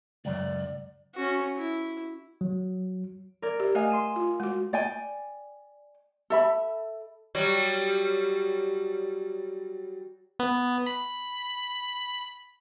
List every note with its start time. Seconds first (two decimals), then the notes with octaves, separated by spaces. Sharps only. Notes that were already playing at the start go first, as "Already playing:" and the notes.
0.25 C#2 F#2 D5
1.15 C#4 F#4
1.57 E4
2.41 F#3
3.42 A#4 D5 G#6
3.60 G4
3.75 A3 D#5 F5 G#5 D#6
3.90 C6 D#7 E7
4.16 F4
4.40 G#3 F#4
4.73 D5 G5 G#5
6.30 A4 E5 B5
7.35 F#3 G3
10.39 B3
10.87 B5